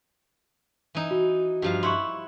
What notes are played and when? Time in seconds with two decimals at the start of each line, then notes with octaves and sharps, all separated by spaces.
0.95 E3 D#4
1.11 F#4
1.62 G2 F3 F5
1.83 E4 F#5 C6 C#6